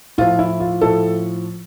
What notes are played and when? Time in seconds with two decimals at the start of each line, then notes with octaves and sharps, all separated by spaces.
0.18 A2 F3 F4
0.39 E4
0.60 F4
0.81 A2 F3 A4